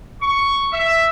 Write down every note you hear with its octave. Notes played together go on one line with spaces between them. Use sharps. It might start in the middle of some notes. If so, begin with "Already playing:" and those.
C#6
E5